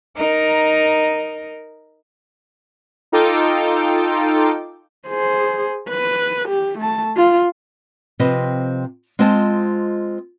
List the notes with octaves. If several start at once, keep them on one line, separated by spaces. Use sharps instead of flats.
D#4 A#4
D#4 F4 A4 G5 D6
G#4 C5
B4
G4
A3 A5
F4
C3 F3 C4 B4 C5 D#5
G#3 C4 F4 C5 D#5 A5